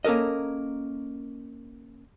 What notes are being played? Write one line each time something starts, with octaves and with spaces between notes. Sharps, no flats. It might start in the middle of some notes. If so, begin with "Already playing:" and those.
A#3 C#4 A4 A#4 D#5